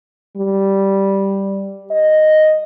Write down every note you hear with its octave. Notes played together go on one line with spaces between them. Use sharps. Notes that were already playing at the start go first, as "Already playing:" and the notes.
G3
D#5